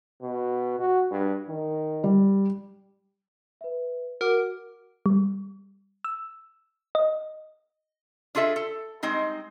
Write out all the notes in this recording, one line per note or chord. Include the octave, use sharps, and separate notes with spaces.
B2
F#4
G2
D#3
G3
B4 E5
F#4 A#4 F#5 D6
G3
E6
D#5
D4 F4 G#4 A4 E5
A4
G3 G#3 C4 D#4